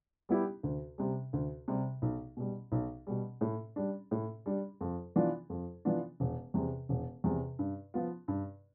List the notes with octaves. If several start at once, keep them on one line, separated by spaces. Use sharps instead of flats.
G3 B3 E4 G4
D2
C3 G3
D2
C3 G3
B1
B2 G3
B1
B2 G3
A2
G3 D4
A2
G3 D4
F2
E3 B3 D4 F4
F2
E3 B3 D4 F4
E1
E2 C3
E1
E2 C3
G2
F3 B3 F4
G2